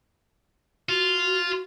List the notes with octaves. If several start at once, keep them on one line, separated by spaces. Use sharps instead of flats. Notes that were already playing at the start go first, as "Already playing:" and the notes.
F4 F#4